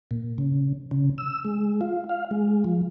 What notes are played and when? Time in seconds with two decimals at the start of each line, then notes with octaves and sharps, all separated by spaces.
0.11 A#2
0.38 C#3
0.91 C#3
1.18 E6
1.45 G#3
1.81 F4
2.09 F5
2.31 G#3
2.64 F3